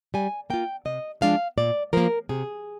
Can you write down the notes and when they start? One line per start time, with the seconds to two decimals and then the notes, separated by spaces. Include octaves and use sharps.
0.14 G3 G#5
0.50 A#3 F4 G5
0.85 C3 D#5
1.21 F3 G#3 D4 F4 F5
1.58 A#2 D5
1.93 F3 A#3 A#4
2.29 C3 G#4